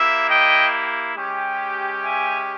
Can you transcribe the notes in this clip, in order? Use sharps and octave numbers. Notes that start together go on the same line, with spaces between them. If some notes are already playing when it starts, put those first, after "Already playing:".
Already playing: A#3 E4 G4 E5
D#5 G5
G#3 C#4 G4
E5 G#5